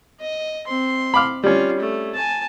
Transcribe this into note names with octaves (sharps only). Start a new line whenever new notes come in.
D#5
C4 C6
B5 D6 F6
G3 C#4 F4
A3
G#5 A5